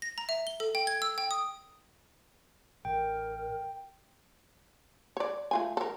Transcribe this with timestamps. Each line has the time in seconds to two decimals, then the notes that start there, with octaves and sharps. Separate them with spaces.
0.02 A#6
0.18 A#5
0.29 E5
0.47 G7
0.60 A4
0.75 G5
0.87 G#6
1.02 E6
1.18 G5
1.31 D#6
2.85 A1 A#4 G5
5.17 C#5 D5
5.51 A3 F4 G#5
5.77 A4 A#4